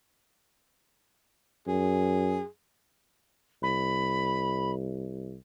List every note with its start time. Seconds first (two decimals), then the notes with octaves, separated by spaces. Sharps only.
1.67 F#2 G#4
3.62 C2 B5